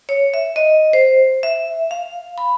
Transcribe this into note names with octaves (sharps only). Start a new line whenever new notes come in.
C#5
E5
D#5
C5
E5
F5
B5